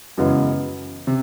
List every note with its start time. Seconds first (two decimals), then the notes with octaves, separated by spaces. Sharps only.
0.18 F#2 C#3 E3 G#3 B3
1.07 C3